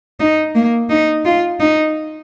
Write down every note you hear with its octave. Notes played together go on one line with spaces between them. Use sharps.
D#4
A#3
D#4
F4
D#4